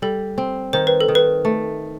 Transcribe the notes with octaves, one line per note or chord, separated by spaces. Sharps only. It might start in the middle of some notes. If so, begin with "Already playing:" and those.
G3 A4
C4
D#3 C5
B4
A4
D#3
B4
A3